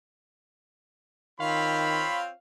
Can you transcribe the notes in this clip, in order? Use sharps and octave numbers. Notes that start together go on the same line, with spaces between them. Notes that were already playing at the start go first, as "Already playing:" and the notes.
D#3 C4 F4 C#5 F5 B5